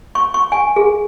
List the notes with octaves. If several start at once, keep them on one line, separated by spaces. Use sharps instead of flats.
C#6
C#6
G#5
G#4